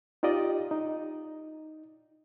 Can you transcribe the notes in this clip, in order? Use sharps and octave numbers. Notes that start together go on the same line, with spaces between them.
D#4 F4 G4 D5 D#5
D#4